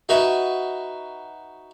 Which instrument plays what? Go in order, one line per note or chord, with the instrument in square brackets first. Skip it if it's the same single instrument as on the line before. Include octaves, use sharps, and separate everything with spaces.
[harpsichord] D#4 F#4 B4 E5